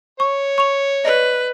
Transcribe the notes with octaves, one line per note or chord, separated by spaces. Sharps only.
C#5 C#6
C#6 F7
B4 D5 D#5